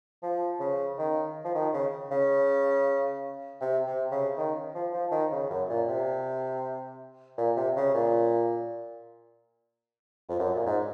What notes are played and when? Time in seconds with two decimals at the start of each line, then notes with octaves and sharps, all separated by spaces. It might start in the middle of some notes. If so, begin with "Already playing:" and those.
0.23 F3
0.60 C#3
0.98 D#3
1.44 F3
1.55 D#3
1.74 C#3
2.11 C#3
3.61 C3
3.87 C3
4.11 C#3
4.37 D#3
4.75 F3
4.93 F3
5.12 D#3
5.32 C#3
5.50 F#2
5.69 A#2
5.88 C3
7.38 A#2
7.56 C3
7.76 C#3
7.94 A#2
10.29 F2
10.39 F#2
10.55 A#2
10.66 G#2